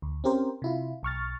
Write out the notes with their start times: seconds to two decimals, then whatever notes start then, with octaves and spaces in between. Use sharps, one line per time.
0.02 D2
0.24 C4 C#4 G4 A#4 C5
0.62 C3 E4 F4
1.03 B1 C#6 F6 A6